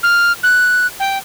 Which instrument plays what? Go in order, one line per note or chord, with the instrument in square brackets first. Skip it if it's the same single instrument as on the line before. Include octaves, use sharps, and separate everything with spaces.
[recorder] F6
F#6
G5